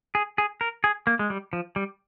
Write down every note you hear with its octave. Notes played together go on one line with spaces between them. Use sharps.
G#4
G#4
A#4
G#4
A#3
G#3
G3
F3
G3